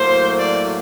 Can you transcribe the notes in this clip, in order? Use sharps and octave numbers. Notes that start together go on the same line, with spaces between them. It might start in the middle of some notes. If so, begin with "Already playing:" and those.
Already playing: A2 F#3 A#3 C5
D5